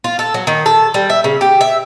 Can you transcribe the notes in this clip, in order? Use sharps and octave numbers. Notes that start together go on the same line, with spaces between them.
F4
A4
F#3
D#3
A4
G3
E5
C#3
G4
E5